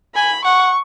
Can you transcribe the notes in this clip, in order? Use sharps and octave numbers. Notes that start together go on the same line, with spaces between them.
G#5 B5
F#5 C#6